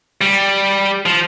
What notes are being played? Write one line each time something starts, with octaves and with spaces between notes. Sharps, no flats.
G3
F3